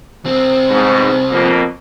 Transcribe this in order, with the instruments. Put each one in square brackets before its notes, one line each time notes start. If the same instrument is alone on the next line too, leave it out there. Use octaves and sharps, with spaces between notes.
[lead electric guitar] C2 C4
[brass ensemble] G#2 B2
F2 B2 A#3